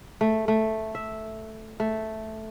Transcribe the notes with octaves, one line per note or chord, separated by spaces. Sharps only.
A3
A3
E5
A3